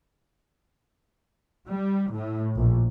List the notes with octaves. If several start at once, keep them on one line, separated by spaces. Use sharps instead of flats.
G3
A2
A#1